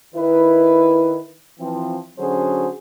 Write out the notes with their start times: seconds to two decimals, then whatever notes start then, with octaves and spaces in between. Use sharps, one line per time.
0.15 D#3 E4 B4
1.59 E3 F3 C4
2.18 D3 F#3 C#4 F#4 G#4 C5